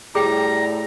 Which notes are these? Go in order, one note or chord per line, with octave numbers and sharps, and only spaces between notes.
A2 G3 G#4 G5 A#5